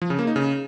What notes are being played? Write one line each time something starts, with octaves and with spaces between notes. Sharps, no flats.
F3
C#3
A#3
D#4
C#3